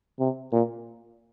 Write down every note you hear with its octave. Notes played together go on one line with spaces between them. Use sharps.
C3
A#2